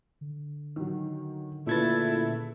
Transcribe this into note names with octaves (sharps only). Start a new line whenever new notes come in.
D3
D#3 F#3
A#2 C#3 A3 E4 B4 G#6 A6